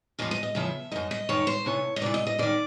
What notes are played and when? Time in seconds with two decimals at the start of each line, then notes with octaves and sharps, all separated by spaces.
0.19 E2 C#3 F3 D#5
0.31 D#5
0.43 D#5
0.55 E2 C#3 F3 E5
0.92 D#3 D#5
0.96 F#2
1.11 D#5
1.29 F#2 D#3 C#5
1.47 C5
1.65 D2 C3 E3 C#5
1.96 D#5
2.02 D2 C3 E3 D5
2.14 D#5
2.27 D#5
2.39 F#2 D#3 D5